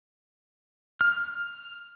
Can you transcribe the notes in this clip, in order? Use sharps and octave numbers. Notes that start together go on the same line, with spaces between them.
F6